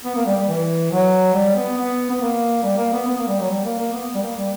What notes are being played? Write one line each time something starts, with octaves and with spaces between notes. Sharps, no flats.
B3
A#3
G3
G3
E3
F#3
G3
B3
B3
B3
A#3
G3
A#3
B3
B3
A#3
G3
F#3
G3
A#3
A#3
B3
G3
A#3
G3